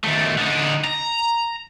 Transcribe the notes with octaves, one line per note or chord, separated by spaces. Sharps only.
D#3 A3
D3 D#4
A#5